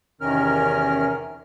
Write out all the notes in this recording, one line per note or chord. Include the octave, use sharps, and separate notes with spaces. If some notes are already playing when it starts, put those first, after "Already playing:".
E2 C3 D#3 C#4 A#4 F6